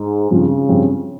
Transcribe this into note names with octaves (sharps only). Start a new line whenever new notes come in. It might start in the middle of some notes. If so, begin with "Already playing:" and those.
Already playing: G#2
G2 C#3 F3 C4 F4
G2 F3 C4 F4